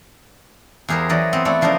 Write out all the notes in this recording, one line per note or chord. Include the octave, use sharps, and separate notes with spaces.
E2 G4 G#4 A#4 C5
E3 F#3 D5 D#5
B3 C4
A3 B3 E4 A4 D5
C#3 F3 D4 D#4 A#4